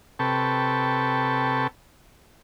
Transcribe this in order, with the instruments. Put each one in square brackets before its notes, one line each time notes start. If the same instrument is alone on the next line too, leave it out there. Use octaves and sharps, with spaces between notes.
[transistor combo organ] C3 A4 B4 G5 A5 C#6